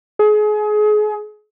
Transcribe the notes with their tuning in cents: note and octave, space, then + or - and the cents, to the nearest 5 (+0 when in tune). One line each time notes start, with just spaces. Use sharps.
G#4 +30